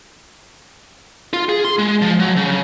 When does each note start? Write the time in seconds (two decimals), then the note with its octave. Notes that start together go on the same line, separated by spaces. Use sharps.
1.33 F4
1.49 G#4
1.65 C6
1.79 G#3
2.02 F3
2.19 F#3
2.36 C#3